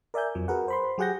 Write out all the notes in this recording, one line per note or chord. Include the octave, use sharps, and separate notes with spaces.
A#4 D5 E5 G#5 G6
F2 F3 F#3
F#4 G#4 A#4 B4 F#5
C5 B5 C6
F#3 G4 G#4 F#5 G6 A#6